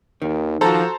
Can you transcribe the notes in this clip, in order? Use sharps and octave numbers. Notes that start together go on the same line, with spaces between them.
D#2 D#3
F3 F#4 A4 C5 A5 A#5